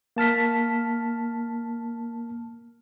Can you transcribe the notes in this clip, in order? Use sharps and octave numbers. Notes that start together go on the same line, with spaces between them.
A#3 A5 F6 B6